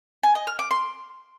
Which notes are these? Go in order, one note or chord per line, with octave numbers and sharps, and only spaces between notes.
G#5
D#5
F6
D6
C6